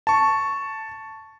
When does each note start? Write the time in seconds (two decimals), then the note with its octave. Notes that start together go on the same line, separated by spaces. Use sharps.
0.07 A5 C#6